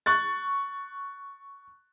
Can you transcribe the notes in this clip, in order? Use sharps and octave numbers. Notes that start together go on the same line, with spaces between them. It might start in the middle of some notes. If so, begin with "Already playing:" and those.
C#6 F#6 A6